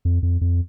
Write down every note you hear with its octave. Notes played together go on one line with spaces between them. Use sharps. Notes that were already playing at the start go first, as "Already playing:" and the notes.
F2
F2
F2